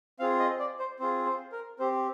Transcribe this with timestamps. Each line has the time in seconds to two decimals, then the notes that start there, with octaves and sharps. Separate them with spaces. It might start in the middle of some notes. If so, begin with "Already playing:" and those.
0.19 C4 F4 G#4 F5
0.40 D#5
0.59 D5
0.79 C5
0.99 C4 F4 G#4 C5
1.25 C5
1.52 A#4
1.79 C4 G4 C5